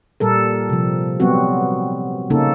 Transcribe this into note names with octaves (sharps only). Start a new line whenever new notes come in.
A#2 G3 A4 A#4
C3 F3
F#3 G3 B3 C4 F#4
C#3 A#3 C#4 D#4 A4